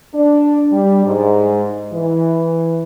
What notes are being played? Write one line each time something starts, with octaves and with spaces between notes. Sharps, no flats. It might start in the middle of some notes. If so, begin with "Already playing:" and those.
D4
G3
G#2
E3